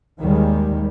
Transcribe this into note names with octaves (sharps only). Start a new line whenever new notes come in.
D#2 D#3 G3 G#3